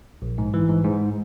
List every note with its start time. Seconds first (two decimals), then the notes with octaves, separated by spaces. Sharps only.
0.22 A#1
0.38 G#2
0.54 E3
0.69 G#2
0.85 G#2